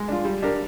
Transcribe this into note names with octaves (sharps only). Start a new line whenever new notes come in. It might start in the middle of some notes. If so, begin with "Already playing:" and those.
Already playing: G#3
D4 F4
G3
D4 G4 A#4